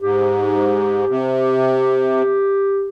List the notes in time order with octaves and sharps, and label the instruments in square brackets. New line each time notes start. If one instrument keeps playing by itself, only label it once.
[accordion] G#2 [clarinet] G4
[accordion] C3